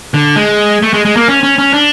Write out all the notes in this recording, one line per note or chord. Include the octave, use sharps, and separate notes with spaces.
D3
G#3
A3
G#3
G#3
A#3
C#4
C#4
C#4
D4